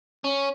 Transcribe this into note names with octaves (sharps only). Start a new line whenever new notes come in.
C#4